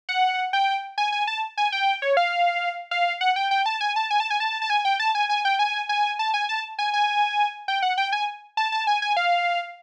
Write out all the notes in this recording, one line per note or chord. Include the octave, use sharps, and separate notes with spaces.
F#5
G5
G#5
G#5
A5
G#5
G5
C#5
F5
F5
F#5
G5
G5
A5
G#5
A5
G#5
A5
G#5
A5
A5
G#5
G5
A5
G#5
G#5
G5
G#5
G#5
A5
G#5
A5
G#5
G#5
G5
F#5
G5
G#5
A5
A5
G#5
G#5
F5